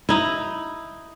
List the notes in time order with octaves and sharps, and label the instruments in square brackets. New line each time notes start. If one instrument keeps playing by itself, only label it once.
[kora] D#4 E4